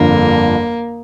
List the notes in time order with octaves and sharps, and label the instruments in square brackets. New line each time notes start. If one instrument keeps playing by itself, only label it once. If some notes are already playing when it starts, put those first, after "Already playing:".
Already playing: [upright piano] G1 F2 D3 [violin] A#3